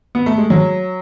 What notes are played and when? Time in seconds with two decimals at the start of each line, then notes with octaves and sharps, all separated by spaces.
0.15 B3
0.26 A3
0.38 G#3
0.50 F#3